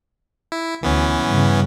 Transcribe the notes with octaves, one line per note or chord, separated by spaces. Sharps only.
E4
D2 E3 B3 C#4
G2 C#3